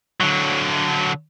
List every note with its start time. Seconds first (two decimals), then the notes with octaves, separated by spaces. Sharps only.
0.20 D3 F#3